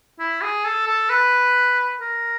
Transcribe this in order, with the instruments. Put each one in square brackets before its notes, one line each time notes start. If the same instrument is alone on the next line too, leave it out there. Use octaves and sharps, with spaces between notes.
[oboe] E4
G#4
A4
A4
B4
A#4